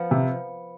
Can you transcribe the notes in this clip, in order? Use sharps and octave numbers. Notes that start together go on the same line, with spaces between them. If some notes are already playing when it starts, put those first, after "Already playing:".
Already playing: F3 B3
C3